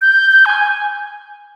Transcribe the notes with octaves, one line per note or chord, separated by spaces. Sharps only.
G6
G6
G#5
G#5